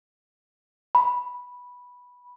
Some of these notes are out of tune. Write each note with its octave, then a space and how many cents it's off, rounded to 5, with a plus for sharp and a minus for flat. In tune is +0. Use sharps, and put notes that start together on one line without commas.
B5 -10